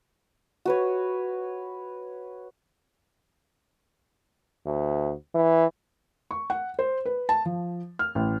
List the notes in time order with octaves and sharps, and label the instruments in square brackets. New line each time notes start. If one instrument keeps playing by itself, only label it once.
[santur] F#4 B4 C#5
[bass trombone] D2
E3
[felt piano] C#6
F#5
C5
B4
A5
F3
F6
A1